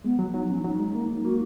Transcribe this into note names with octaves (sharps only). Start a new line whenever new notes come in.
G#3 B3
F#3
F#3 D#4
F3 C#4
F#3 D#4
G#3
A#3
A#3 F#4